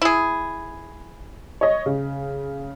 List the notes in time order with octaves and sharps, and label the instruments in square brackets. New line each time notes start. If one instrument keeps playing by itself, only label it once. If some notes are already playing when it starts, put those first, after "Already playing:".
[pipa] E4 G#4
[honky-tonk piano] C#5 D#5
C#3